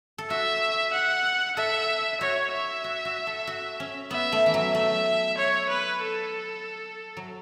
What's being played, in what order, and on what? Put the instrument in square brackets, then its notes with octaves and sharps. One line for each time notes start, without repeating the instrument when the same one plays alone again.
[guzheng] A4
[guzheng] F#4 [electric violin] E5
[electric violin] F#5
[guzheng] A4 [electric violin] E5
[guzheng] F#4 [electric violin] C#5
[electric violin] E5
[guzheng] F#4
F#4
A4
F#4
C#4
[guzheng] B3 [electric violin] E5
[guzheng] A3
E3
F#3
[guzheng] A3 [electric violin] E5
[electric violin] C#5
B4
A4
[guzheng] F#3